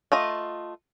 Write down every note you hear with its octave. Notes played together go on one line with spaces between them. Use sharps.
A3 F4 D#5